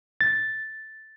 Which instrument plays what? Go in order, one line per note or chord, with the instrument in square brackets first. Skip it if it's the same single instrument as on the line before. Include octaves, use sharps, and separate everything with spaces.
[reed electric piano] A6